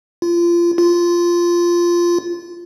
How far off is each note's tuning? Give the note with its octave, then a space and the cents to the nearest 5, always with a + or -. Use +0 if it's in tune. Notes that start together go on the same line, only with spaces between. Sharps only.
F4 -25
F4 -10